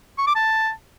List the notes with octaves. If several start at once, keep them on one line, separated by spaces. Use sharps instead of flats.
C#6
D6
A5